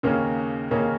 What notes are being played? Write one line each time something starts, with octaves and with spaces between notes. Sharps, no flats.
D#2 C#3 A#3 C#4
D#2 C#3 A#3 C#4